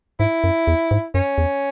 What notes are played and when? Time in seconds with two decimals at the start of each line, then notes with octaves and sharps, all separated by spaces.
0.20 G#2 E4
0.44 F#2
0.67 E2
0.91 G#2
1.14 F#2 C#4
1.38 E2